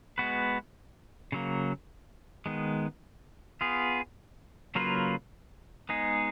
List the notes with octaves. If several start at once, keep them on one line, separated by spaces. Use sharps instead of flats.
G#3 B3 F#4 B4
C#3 F#3 A#3
D#3 G#3 B3
B3 F4 G#4
C#3 F#3 A#3 F4 B4
G#3 B3 D#4 G#4